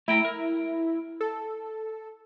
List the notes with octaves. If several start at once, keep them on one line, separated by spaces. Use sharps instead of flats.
A3 E4 G5 A#5
A#4
A4